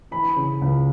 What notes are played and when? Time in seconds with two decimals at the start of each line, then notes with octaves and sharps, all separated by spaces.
0.11 E3 B5
0.36 C#3
0.61 C#2